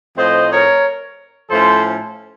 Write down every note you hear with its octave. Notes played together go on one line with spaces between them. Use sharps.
A2 F3 C4 C5 D#5
A#4 C#5
A2 F3 A3 C#4 A4 C5